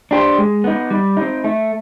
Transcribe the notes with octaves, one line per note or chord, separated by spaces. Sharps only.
D4 G4 C5
G#3
B3 D#4
G3
C4 D#4
A3